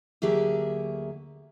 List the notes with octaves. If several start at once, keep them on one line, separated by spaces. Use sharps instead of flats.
D2 F#3 A#3 G4 G#4 E5